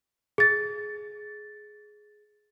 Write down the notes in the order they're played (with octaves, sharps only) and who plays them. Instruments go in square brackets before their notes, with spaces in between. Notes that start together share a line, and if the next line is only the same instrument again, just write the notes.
[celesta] G#4 A6